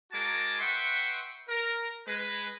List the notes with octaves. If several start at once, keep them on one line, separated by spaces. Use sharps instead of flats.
G#3 F#4 A#4 G#5 A5 D6
B4 E5 F#5 G5 C6 C#6
A#4
G#3 B4